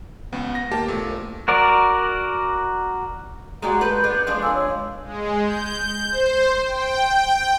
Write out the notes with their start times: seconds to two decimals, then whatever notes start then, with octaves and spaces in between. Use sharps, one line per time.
0.33 C#2 B3
0.55 A#6
0.71 D#2 A#3 G4 A5
0.88 E1 A#2 A3
1.07 A#1
1.48 F#4 A#4 D5
3.62 G#3 F#4 G4 D5 A#5
3.81 A4 B4 G6
4.04 B3 D4
4.27 F2 G#3 D4 C6
4.42 A4 G#5 E6
4.55 C#5
5.04 G#3
5.44 G6
6.09 C5
6.67 G5